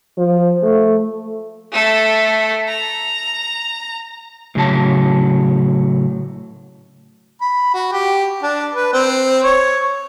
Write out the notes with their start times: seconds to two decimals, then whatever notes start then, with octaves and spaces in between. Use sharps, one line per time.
0.18 F3
0.63 A3
1.72 A3 A4
2.68 A#5
4.55 A2 C#3 F#3 A5
7.41 B5
7.74 F#4
7.92 G4
8.43 D4
8.74 B4
8.93 C4
9.44 C#5